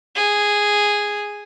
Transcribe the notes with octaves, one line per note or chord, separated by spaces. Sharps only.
G#4